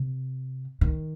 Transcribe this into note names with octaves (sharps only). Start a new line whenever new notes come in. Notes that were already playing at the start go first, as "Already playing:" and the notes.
Already playing: C3
D#3